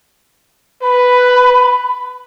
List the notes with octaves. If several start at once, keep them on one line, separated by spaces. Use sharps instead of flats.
B4 B5